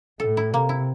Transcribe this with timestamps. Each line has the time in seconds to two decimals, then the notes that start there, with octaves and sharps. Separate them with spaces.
0.20 A2 A4
0.37 E4
0.53 C3 A#3
0.69 E4